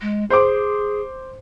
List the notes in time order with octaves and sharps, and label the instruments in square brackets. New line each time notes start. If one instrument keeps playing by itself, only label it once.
[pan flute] G#3
[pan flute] G#4 [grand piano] C5 D6